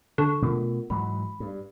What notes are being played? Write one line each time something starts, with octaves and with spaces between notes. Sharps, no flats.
D3 C#6
B2 A3 F4 A#4
G#2 E3 F#3 B5
G2